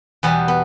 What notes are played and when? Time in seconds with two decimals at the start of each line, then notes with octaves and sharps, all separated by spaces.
0.23 E2 B2 G3 B3
0.48 B3